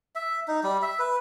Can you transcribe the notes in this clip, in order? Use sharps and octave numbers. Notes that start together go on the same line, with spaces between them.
E5
D#4
G3
E5
B4